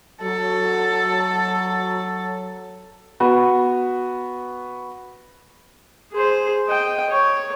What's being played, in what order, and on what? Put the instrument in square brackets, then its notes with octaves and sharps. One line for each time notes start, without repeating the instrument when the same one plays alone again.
[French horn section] F#3 [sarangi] A4
[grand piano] B3 F#4
[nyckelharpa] G#4 C5
D#5 G5
C#5